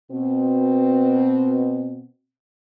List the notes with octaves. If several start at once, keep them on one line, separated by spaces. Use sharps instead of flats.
B2 C4